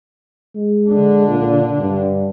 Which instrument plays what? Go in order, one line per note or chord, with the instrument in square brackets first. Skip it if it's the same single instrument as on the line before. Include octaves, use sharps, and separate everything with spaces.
[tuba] G#3
[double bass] D3 D4
[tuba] A#2
G2